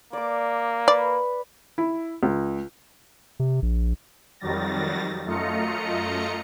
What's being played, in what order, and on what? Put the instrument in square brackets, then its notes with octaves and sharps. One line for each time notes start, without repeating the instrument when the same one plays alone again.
[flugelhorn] A#3 [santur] D5 D6
[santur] B4 [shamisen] D5
[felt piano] E4
C#2
[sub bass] C3
A#1
[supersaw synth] F2 D#3 F#3 G3 A6 A#6
F#2 A3 F4 D#5 A#5 C#7